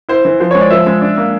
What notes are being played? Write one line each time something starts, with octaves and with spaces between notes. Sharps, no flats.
E4 C5
E3
F3 C5
G#3 C#5
D5
F3 E5
G#3
D4
A#3